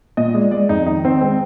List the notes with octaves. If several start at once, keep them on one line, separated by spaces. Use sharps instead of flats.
A#2 D#5
G#3 D5
G#3 D5
F2 D#4
D#3 D#4
D#3 C4
G#3 C4